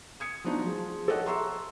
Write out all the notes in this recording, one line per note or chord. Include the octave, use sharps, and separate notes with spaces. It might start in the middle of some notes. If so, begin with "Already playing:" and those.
D#6 G#6 C#7
F3 B3 D4 D#4 F#4
F3 G#3
G4 A4 C#5 D#5 F#5 F#6
E5 A#5 C6 C#6 E6